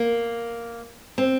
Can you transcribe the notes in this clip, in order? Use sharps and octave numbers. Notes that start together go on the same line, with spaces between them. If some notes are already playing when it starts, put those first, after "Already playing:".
Already playing: A#3
C4